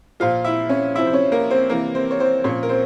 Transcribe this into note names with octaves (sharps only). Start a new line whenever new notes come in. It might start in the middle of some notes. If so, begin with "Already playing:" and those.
A#2 F3 F4 F5
E4 E5
C#4 C#5
C3 F3 E4 E5
C5
C#4 C#5
A#3 A#4
C4 C5
C3 E3 A#3 A#4
C4 C5
C#5
C4 C5
A#2 F3 C#4 C#5
A#4
C4 C5